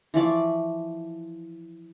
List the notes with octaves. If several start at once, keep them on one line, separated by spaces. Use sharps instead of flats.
E3 F3 D5 C#6